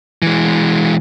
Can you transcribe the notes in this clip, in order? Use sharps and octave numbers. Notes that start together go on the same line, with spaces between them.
E3 G#3